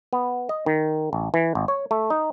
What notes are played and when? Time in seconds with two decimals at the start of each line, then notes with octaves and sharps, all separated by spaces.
0.13 B3
0.49 D#5
0.66 D#3
1.13 A1
1.34 E3
1.55 G#1
1.68 C#5
1.91 A3
2.10 D#4